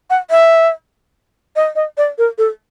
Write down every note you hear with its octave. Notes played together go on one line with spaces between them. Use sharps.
F#5
E5
D#5
D#5
D5
A#4
A4